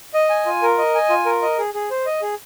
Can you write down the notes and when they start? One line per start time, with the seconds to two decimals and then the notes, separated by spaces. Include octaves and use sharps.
0.14 D#5
0.30 G#5
0.46 F4
0.62 A#4
0.78 D#5
0.95 G#5
1.10 F4
1.26 A#4
1.42 D#5
1.58 G#4
1.74 G#4
1.91 C5
2.06 D#5
2.22 G#4